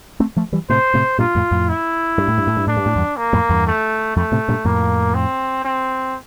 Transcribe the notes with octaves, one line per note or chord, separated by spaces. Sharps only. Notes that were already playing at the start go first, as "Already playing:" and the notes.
A3 C4
F3 A3
E3 G3
A2 C3 C5
A2 C3
G2 A#2 F4
F2 A2
F2 A2
E4
G2
A2
G2
A2
G2
A2 D4
G2
A2
E2 G2
A#3
F2 A2
E2 G2
A3
F2 A3
A2 C3
G2 A#2
F2 A2 A#3
C4
C4